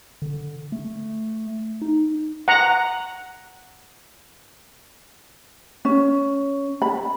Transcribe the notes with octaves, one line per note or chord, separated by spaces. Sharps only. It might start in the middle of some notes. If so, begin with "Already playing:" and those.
D3
A3
D#4
F#5 A#5
C#4
B5